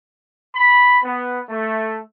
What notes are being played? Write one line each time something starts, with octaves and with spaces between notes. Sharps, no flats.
B5
B3
A3